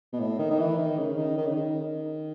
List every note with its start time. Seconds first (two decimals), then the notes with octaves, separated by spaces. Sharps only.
0.13 B2
0.20 A2
0.39 D#3
0.51 D#3
0.60 E3
0.78 D#3
0.98 C#3
1.18 D#3
1.37 D#3
1.47 C#3
1.56 D#3